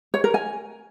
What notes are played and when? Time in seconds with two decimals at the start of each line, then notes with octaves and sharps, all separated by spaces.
0.14 C#5
0.24 A#4
0.34 G#5